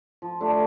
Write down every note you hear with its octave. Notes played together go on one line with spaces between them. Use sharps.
F3
A3 D4 G4